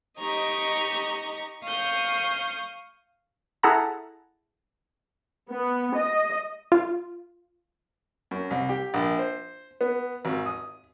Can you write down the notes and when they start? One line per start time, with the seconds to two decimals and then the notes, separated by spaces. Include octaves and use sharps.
0.19 D#4 G4 D#5 A#5 C#6
1.64 F5 C#6 D#6 G6
3.63 E4 G#4 A4 F#5 A5 A#5
5.50 B3
5.96 D#5
6.72 F4
8.31 F#2
8.51 C2
8.69 G4
8.94 A#1
9.19 C5
9.81 B3
10.25 G#1
10.46 D#6